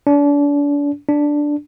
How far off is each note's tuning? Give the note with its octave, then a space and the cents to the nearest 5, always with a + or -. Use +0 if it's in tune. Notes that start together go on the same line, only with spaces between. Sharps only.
D4 -35
D4 +0